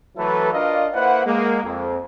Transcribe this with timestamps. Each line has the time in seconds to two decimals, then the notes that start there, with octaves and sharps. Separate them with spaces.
0.17 E3 F#3 A3 E4 A4 B4
0.53 D4 F4 A#4 D5 D#5 F5
0.94 A#3 E4 B4 C5 F#5
1.26 G#3 A#3
1.64 F2